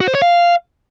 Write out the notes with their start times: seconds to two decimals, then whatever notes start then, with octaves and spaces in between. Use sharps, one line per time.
0.01 F#4
0.08 C5
0.15 C#5
0.22 F5